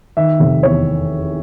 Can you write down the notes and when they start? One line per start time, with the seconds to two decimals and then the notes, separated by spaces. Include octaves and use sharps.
0.17 D#3 E5
0.40 F1
0.63 E2 C#5